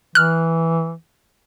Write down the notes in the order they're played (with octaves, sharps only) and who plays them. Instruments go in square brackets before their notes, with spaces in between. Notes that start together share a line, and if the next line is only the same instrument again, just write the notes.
[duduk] E3 [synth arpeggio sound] F6 F#6